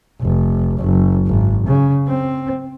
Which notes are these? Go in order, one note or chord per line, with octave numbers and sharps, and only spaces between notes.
F1
F#1
G#1
C#3
C4